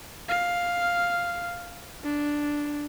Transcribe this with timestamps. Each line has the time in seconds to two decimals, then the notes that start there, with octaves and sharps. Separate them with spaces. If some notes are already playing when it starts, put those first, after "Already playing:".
0.28 F5
2.04 D4